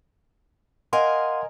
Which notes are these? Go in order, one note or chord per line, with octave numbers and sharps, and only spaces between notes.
A#4 D#5 F5 F#5 G#5 C6